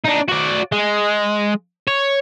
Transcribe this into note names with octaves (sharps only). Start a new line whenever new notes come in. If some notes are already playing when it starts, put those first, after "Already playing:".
D4 D#4
F#4 D5
G#3
C#5